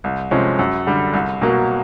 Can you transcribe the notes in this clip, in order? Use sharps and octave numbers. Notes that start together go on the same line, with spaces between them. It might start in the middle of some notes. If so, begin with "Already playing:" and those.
C2
C3 F3 G#3 C#4
F#2
D3 G3
C2
B2 F#3 A#3